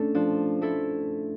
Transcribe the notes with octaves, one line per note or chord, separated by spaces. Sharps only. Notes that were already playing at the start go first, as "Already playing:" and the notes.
Already playing: A3 C#4 D4 A4
F3 D4
A3 E4 A4